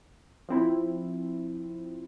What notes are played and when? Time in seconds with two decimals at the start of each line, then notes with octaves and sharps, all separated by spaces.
0.49 F3 C4 E4